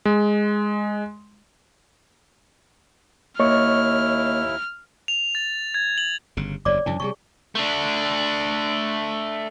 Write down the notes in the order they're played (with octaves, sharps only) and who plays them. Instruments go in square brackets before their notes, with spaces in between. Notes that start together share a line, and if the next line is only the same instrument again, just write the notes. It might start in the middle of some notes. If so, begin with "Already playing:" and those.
[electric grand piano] G#3
[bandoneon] D#2 E4 [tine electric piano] A#3 [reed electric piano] C#5 D#5 C#6 [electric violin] F6
[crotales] F7
A6
G#6
F#7
[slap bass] G1 C#3
[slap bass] F#1 E2 G2 [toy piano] C#5 D5 D6
[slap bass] F#2 C#3 E3 [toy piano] D4 A5
[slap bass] C3 F#3 G3 [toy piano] G#4 C#6
[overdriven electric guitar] A3 D4